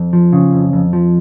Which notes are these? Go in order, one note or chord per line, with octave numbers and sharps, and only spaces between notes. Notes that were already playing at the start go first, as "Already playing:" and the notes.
Already playing: F2
F3
C#3
F2
F2
F3